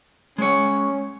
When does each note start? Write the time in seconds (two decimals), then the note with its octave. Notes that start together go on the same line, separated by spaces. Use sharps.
0.38 G#3 C#4 C#5